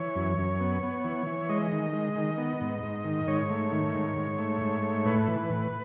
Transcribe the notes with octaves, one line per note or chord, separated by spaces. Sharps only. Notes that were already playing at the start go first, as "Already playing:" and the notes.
Already playing: E3 C#5
F#2
F#2
B3
B3
E3
E3
G#3 D#5
D#3
G#3
D#3
B3
G#2
G#2
D#3
G#2 C#5
A3
D#3
G#2
G#2
A3
G#2
A3
A2 B4
E3
A2